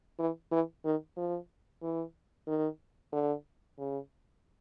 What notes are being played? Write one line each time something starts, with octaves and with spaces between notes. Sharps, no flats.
E3
E3
D#3
F3
E3
D#3
D3
C#3